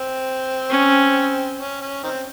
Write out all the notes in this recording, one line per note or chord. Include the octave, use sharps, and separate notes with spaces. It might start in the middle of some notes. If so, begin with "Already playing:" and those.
Already playing: C4
C#4
C#4
C#4
D#3 C4